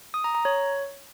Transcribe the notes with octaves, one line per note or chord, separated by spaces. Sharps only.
D#6
A#5
A#5
C#5